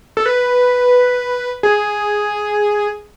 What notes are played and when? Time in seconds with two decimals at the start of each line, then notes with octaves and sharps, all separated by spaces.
0.17 A4
0.26 B4
1.63 G#4